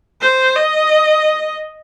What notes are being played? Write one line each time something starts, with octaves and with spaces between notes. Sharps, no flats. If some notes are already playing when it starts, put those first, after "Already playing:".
C5
D#5